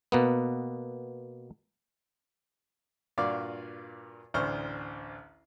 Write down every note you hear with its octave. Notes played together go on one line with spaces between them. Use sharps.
B2 A#3 B3
G2 A#2 F4 F#4 D5 F5
A1 D2 D4 C5 C#6 F6